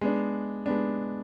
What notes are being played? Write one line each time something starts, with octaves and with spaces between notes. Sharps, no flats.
G#3 B3 D4
G#3 B3 D4